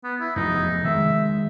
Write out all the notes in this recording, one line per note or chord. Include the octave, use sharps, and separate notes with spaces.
B3
E4
F1 E2 D#4
D#3 G#3 E5